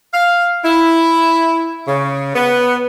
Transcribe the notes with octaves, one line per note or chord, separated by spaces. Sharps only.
F5
E4
C#3
B3